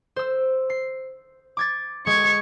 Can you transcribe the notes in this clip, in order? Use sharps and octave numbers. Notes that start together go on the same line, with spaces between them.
C5 E6
C7
D6 G#6 A6
G#3 C#6 G#6